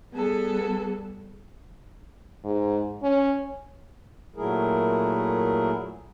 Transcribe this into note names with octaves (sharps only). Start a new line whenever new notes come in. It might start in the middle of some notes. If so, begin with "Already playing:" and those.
G3 B3 G#4 A4
G#2
C#4
A#2 F#3 A3 E4 G#4 A#4